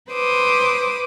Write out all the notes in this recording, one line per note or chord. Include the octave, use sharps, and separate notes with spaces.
B4 C5 D6 D#6